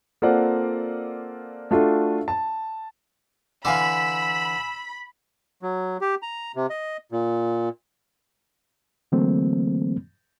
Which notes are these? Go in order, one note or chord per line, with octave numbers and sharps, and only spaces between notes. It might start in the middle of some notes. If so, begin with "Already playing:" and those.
A#3 C4 F4 A4 D5 F#5
A3 D4 F4 F#4 A4
A5
D3 E3 F5 G#5 B5 D6 E6
F#3
G4
A#5
C3
D#5
A#2
D3 E3 F#3 A3 A#3 C4